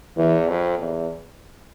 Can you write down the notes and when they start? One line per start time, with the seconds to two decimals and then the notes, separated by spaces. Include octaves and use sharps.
0.17 E2 E3
0.48 F2
0.79 E2